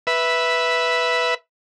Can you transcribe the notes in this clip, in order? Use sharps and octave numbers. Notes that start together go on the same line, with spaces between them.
B4 E5